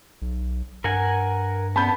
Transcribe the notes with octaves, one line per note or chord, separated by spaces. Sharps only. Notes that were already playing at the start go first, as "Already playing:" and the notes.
B1
G2 A#4 F#5 G#5
B3 A5 B5 G6